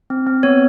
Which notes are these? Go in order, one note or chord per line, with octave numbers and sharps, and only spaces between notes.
C4
C4
B3 C#5